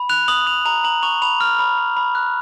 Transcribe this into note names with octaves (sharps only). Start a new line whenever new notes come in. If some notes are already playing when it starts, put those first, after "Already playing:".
Already playing: B5
F#6 F7
D#6 F#7
D#6 F7
A#5 F7
A#5 F#7
C#6 F7
B5 F7
F6
B5
B5
B5
F#6